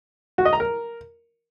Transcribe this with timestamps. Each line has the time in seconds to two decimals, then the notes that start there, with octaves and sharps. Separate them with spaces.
0.38 F#4
0.45 D#5
0.53 A#5
0.60 A#4